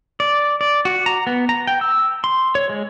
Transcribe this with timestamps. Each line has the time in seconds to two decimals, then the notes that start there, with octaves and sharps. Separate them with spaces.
0.20 D5
0.61 D5
0.85 F#4
1.06 A#5
1.27 B3
1.49 A#5
1.67 G5
1.81 E6
2.24 C6
2.55 C#5
2.70 G#3